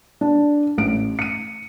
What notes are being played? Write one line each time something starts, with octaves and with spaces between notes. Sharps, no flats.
D4
A1 D7
C#7 D#7